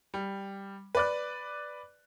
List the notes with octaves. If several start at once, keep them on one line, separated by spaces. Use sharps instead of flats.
G3
B4 D5 F#6